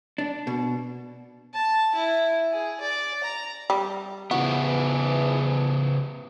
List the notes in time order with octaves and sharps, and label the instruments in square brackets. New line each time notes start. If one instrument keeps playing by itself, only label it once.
[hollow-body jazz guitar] D4
B2
[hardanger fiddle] A5
E4
G#4
D5
A#5
[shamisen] G3
[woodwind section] E2 G#2 E3 [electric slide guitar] C#3 B3 [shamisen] F#4